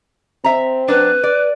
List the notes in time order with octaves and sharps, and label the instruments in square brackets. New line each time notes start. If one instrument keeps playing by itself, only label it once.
[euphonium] C4 [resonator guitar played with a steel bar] E5 A#5
[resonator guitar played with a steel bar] F#3 D4 [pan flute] B4
[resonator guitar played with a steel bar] D5